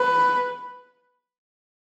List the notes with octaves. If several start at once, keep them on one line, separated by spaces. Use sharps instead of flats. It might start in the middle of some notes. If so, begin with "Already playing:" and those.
Already playing: B4